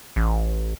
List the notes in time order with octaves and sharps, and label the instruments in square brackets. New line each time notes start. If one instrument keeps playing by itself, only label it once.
[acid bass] A1